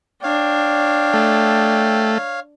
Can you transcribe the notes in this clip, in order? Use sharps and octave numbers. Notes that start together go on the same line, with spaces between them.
D4 C#5 F5 G5
A3